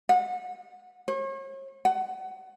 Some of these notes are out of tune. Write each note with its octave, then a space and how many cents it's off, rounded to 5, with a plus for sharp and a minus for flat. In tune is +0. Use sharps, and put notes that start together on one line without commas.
F#5 -30
C#5 -40
F#5 +20